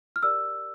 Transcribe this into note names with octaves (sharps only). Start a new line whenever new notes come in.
F6
G4 A#4 D5 E6